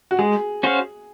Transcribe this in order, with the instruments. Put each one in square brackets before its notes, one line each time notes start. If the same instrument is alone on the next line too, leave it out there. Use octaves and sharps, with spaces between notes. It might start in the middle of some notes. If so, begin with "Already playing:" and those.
[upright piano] F#4
[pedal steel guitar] G#3 [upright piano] G#4
[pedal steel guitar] C#4 F#4 C5 F5